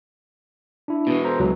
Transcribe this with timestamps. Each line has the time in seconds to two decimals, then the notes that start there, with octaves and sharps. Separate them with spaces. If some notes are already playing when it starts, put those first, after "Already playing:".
0.88 D4 E4
1.07 B2 E3
1.25 A4 C5 A#5
1.40 C#2 F#3